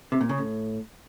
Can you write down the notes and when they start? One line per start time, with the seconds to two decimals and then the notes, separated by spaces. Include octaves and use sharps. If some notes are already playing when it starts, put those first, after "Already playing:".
0.12 C3
0.21 A#2
0.29 C#3
0.38 A2